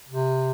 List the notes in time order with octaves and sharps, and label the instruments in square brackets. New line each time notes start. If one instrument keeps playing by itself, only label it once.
[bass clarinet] C3